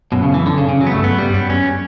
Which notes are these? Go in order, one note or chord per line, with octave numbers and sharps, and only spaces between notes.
F#2 B2
C#3
E3
D3
C#3
C#3
F#3
B3
G2 A3
F#2 B3
G2 G3
G2
F#2 B3
F#2 C#4